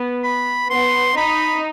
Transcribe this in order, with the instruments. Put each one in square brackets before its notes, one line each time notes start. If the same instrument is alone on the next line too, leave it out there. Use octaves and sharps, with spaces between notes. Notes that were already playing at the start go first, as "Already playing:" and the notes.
Already playing: [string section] B3
[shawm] B5
[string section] B3 [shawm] C6
[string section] D#4 [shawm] B5